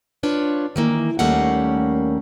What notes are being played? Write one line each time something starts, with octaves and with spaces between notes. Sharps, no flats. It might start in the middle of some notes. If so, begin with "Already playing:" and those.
D4 F4 B4 C#5
D#3 E3 A#3
D#2 G3 A3 A#3 C#4 F#5